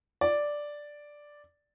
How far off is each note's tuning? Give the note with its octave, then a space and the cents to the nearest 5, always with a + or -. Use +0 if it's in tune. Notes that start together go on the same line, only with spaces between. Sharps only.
D5 +0